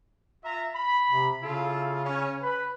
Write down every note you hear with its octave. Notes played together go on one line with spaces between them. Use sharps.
F4 E5 A#5
B5
C3
C#3 E4 F4 A4
C#4
B4 B5